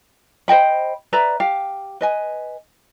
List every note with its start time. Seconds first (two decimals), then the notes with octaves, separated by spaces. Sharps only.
0.48 C5 D#5 G5 B5
1.13 B4 D5 E5 A#5
1.40 G4 F5
2.01 B4 D#5 G#5